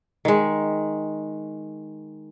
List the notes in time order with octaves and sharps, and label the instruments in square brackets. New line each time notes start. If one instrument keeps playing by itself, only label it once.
[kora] D#3 G#3